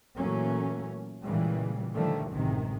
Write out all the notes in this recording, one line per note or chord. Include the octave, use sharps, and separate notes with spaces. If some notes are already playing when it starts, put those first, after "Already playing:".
A#2 E3 F#3 A3 A#3 C#4
A#2 C#3 E3 G3 G#3
D3 D#3 F3 G3 A3
A1 F#2 A2 C3 D#3 G#3